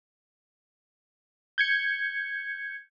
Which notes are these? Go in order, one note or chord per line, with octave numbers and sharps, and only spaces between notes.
G6 G#6 C#7